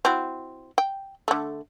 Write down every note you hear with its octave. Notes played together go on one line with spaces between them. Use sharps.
C4 E4 F#4
G5
D3 A3